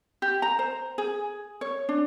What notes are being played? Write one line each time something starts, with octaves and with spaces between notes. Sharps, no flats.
G4
A#5
C5
G#4
C#5
D4